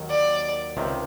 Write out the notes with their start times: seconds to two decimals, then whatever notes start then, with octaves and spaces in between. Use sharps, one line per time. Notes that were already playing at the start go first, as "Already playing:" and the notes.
Already playing: D#2 D#3 F#3
0.10 D5
0.77 C#2 C3 D#3